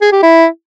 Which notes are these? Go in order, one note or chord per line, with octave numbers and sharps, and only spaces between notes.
G#4
G4
E4